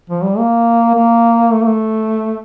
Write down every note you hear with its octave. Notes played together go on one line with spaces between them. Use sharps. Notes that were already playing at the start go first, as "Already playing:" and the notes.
F3
G3
A#3
A#3
A3
A#3
A3